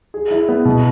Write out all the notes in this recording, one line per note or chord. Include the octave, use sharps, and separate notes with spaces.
G#4
E4
B3
B2